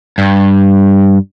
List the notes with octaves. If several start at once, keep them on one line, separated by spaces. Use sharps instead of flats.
G2